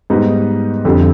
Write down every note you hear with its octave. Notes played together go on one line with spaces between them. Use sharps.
G#2 G3 B3 D#4
F2 D3 G3